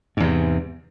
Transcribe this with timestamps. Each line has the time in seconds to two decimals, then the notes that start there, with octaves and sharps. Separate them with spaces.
0.17 G#2
0.20 E2
0.23 C3